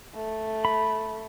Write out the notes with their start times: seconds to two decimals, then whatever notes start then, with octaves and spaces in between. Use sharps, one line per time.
0.15 A3
0.65 B5